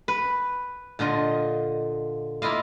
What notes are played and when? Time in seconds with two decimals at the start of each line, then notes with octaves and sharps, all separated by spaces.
0.08 B4
0.99 A#2 D3 F4 D#5
2.42 A#3 E4 F4 D#5 F5